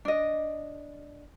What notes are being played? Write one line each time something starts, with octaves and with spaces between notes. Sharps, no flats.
D4 D#5